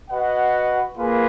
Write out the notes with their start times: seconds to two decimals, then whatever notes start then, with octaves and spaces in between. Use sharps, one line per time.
0.10 F#4 B4 D#5 F#5
0.97 A#3 F4 G#4 B4